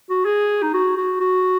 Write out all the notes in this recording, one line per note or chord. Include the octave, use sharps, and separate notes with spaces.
F#4
G#4
D#4
F#4
F#4
F#4